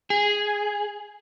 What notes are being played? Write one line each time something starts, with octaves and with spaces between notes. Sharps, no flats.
G#4